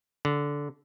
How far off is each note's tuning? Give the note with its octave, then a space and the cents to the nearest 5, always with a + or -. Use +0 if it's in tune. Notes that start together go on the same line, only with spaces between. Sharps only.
D3 -15